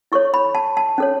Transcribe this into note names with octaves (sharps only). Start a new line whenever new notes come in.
E4 A4 C#5 C#6
B5
A5
A5
C#4 A4 C#5